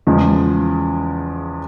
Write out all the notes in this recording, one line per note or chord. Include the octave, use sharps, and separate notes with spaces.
E2 C#3 F3 G#3